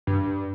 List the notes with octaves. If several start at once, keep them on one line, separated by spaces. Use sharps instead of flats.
G2